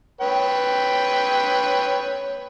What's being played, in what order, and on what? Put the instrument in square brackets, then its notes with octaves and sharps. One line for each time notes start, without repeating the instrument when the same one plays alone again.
[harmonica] B4 C#5 G5